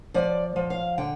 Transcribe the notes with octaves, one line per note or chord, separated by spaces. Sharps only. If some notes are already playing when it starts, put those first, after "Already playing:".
F3 D5
F3
F5
D3 G5